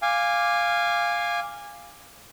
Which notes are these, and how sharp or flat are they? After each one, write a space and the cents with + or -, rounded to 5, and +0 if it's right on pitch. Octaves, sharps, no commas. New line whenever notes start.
F5 +0 G#5 -20 D6 +0